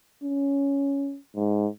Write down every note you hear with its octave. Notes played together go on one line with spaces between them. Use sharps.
C#4
G#2